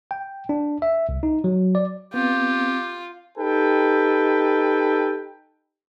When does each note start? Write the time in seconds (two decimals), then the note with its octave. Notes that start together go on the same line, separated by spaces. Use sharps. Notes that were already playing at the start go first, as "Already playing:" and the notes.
0.11 G5
0.49 D4
0.82 E5
1.09 C2
1.23 D#4
1.44 F#3
1.75 D5
2.14 B3 C4 F4 G4
3.38 D#4 G4 A4 B4 G5